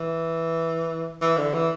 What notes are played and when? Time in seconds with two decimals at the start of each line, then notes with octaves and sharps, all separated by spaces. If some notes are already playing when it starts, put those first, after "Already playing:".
Already playing: E3
1.22 E3
1.37 D3
1.54 E3